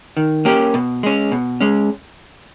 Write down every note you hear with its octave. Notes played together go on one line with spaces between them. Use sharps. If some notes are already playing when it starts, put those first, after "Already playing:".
D#3
A#3 C#4 G4
B2
G#3 C#4
B2
G#3 C#4